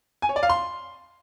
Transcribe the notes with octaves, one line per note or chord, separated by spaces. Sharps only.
G#5
C#5
D5
F5
C6